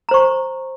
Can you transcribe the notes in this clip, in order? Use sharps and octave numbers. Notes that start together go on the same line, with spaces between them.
C5 A#5 C#6